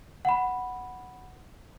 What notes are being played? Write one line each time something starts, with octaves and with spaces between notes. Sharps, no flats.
F#5 B5